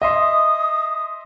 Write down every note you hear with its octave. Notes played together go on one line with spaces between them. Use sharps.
D#5 E5 C6 D#6